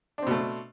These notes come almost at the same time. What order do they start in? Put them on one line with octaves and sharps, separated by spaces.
D4 C4 B2 A3